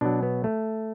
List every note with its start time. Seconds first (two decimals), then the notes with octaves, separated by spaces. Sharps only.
0.01 B2 F#3 D4
0.23 B3
0.44 A3